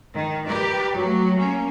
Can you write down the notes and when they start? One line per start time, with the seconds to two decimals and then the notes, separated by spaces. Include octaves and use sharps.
0.13 D#3
0.44 G4 A#4 B4 D5
0.95 F#3 A3
1.37 A#3 C#4